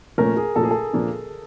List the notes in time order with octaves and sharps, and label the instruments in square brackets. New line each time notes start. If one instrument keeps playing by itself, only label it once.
[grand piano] A#2 F3 A3 C#4 [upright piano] A#4
[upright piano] G#4
[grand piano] A#2 F3 A3 C#4 [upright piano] A4
[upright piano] G#4
A4
[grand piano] A#2 F3 A#3 D4